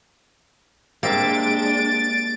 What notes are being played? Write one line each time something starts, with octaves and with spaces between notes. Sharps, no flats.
G3 G#3 A#3 C4 D4 E5 A6 D7